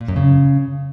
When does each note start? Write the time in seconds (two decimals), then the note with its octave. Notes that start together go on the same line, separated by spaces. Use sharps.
0.01 A#2
0.08 F#2
0.16 C#3